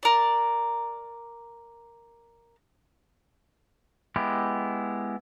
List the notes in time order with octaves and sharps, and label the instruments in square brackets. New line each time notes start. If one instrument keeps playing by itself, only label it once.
[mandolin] A#4 D5
[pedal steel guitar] G#3 B3 E4 G4